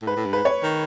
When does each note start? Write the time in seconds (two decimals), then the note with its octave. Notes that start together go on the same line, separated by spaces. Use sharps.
0.02 A2
0.07 G#2 B4
0.16 A2
0.26 G2
0.33 G#2 B4
0.45 C#5
0.63 D#3